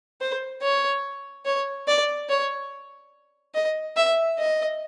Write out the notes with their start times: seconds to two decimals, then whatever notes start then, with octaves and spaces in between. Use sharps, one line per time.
0.21 C5
0.62 C#5
1.45 C#5
1.88 D5
2.29 C#5
3.54 D#5
3.96 E5
4.38 D#5